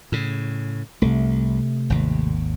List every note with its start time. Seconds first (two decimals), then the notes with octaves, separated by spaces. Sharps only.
0.12 A2 C#3
1.02 C2 C3 A3
1.90 G#1 D#2